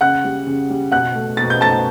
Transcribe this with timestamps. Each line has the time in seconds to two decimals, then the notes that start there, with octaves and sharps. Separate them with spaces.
0.01 C#3 F#5 F#6
0.25 G3
0.47 C#3
0.70 G3
0.92 B2 F#5 F#6
1.15 A3
1.37 B2 A6
1.50 G6
1.60 A3 A5 A6